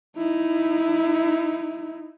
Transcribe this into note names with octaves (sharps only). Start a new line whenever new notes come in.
D#4 E4